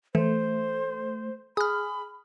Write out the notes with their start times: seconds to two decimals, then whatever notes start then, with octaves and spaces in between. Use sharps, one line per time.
0.15 E3 A3 C5
1.57 G#4 B5 D#6 F6